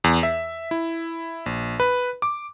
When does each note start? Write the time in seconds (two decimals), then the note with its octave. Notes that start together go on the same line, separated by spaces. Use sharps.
0.04 E2
0.23 E5
0.71 E4
1.46 A#1
1.80 B4
2.22 D6